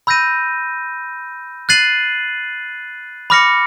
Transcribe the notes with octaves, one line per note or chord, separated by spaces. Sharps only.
B5 E6 G6 A#6 D#7
F#6 A6 C7 D#7 F#7
B5 D6 F6 A#6 C#7